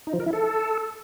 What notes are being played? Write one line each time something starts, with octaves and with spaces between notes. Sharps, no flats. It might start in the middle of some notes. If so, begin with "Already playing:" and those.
D#4
F3
A#4
E4
A4